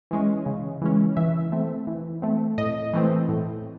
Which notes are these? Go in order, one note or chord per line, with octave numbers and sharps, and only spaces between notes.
E3 G#3 C#4
C#3
E3 G#3 C#4
E3 E5
A3 C4
E3
A3 C4
A2 D#5
E3 A3 C4
A2